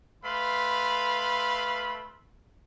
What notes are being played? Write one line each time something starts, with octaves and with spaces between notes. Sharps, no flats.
A3 B4 F5 B5 C6